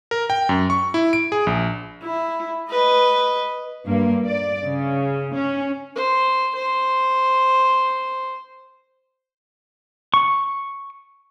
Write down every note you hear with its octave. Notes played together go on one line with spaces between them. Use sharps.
A#4
G5
F#2
C#6
E4
D7
G#4
A#1
E4
B4 D#5
G2 A#3
D5
C#3
C#4
C5
C5
C#6